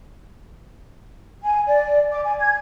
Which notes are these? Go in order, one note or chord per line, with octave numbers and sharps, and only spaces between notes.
G#5
D5
D6
G#5
G#6